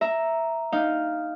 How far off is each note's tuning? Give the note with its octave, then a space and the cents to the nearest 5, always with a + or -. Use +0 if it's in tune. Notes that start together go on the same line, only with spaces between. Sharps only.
E5 +0 A#5 +0
D#4 +0 F5 +0